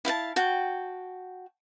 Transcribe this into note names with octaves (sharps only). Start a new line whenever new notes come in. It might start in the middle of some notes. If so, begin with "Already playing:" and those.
E4 F5 G5 A5
F#4 G5 A5